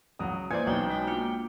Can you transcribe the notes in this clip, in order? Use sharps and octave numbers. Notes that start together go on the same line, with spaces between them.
C#2 F#3 D#6
E3 A#3 C5 D5 G#5 G#6
B1 C#4 D#4 G5
G#3 D#4 F#4
A#3 D4 F4